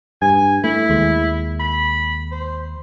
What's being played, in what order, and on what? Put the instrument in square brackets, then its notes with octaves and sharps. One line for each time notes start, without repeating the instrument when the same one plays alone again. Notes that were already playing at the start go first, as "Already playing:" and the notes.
[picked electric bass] G2 [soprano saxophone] G#5
[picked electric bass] A3 [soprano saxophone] E4
[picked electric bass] D#2 G#3
[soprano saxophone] B5
C5